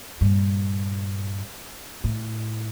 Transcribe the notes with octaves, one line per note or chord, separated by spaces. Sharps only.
G2 A#2
A2